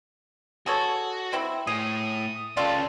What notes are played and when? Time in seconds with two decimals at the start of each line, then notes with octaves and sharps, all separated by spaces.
0.66 F#4 G#4 A4 C#5
1.32 G3 C4 E4
1.67 A2 G#4 D#6
2.57 C#2 C#3 G3 F4 A4 D5